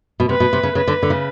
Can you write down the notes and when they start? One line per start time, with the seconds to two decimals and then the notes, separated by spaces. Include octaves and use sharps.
0.20 B2
0.29 C3 B4
0.40 B2
0.53 C3
0.63 C#3
0.75 C#3 B4
0.88 D3
1.03 D3
1.10 C#3